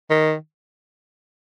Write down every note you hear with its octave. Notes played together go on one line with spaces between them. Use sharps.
D#3